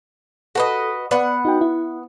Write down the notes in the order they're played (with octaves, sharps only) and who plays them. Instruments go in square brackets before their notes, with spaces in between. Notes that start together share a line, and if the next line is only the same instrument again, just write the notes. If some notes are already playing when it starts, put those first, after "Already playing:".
[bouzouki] F#4 B4 D#5 [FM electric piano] A4
[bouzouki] B3 F#5 [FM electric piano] D5
[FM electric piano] D#4 F#4 G5
E4